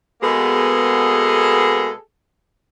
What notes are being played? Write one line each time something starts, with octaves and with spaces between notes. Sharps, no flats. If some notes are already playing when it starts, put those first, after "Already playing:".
B2 G#3 A#3 B3 G#4 A4